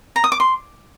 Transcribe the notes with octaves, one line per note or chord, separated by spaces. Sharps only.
A#5
D#6
D6
C6